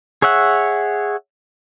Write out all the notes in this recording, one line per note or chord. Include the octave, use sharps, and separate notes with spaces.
G#4 C#5 E5 F#5